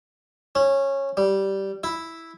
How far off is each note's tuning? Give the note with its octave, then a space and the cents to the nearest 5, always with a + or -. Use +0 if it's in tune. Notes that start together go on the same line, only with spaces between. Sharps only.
C#4 -15
G3 -10
E4 -5